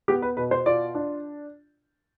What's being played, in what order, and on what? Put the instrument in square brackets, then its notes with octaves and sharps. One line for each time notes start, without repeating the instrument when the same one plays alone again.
[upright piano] B3 G4
B4
B2 B4
C5
F4 D5
D4